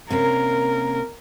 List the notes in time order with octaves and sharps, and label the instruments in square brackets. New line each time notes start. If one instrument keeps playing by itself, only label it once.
[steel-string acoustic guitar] C3 A#3 C#4 [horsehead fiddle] A#4